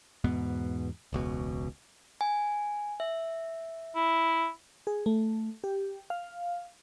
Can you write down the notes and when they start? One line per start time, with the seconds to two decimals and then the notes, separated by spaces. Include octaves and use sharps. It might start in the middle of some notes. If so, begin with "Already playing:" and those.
0.24 E2 G#2 B2 B3
1.13 E1 C#2 B2
2.21 G#5
3.00 E5
3.95 E4
4.87 G#4
5.06 A3
5.64 G4
6.10 F5